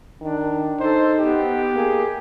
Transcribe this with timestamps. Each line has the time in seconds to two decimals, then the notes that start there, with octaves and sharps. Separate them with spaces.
0.21 D#3 D4
0.80 D#4 A4 C5
1.19 B3 G4
1.75 A#3 G#4